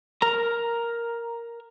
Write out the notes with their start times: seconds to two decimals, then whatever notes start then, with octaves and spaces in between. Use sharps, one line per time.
0.22 A#4 A#5